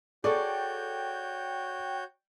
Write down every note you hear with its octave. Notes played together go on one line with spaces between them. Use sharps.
F#4 G#4 A4 C#5 D5 G5 C#6 G6